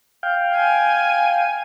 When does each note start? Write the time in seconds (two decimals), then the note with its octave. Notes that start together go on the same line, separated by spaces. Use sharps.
0.23 F5 G5
0.55 G#5